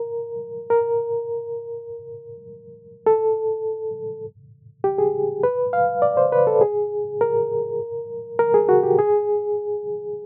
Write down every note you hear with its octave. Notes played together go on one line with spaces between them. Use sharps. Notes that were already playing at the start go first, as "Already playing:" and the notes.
Already playing: A#4
A#4
A4
G4
G#4
B4
F5
D5
C5
B4
A4
G#4
A#4
A#4
G#4
F#4
G4
G#4